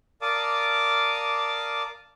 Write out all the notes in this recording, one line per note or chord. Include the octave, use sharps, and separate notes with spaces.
A#4 D5 F5 A5 D6 D#6